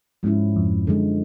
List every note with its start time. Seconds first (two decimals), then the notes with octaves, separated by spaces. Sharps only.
0.23 G#2 F3 G#3 C#4 E4
0.56 F2
0.87 F#2 D3 F3 G#3